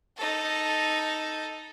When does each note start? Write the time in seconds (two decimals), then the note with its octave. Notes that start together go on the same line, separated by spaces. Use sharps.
0.17 D#4 A4